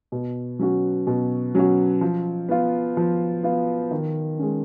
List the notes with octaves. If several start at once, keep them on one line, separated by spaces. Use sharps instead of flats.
B2
F#3 C#4 F#4
B2
F#3 C#4 F#4
F3
B3 F4
F3
B3 F4
D#3
G#3 C#4